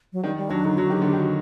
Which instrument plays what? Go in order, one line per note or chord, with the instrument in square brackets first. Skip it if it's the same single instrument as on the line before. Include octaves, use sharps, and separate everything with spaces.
[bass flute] F#3
[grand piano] D#3 [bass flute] G3
[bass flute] G3
[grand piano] F#3 [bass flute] D4
[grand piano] D3 [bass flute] D#4
[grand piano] F#3 [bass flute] F#4
[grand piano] D#3 [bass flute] G4
[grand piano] D3 [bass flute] G4
[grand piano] D#3
[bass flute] F#4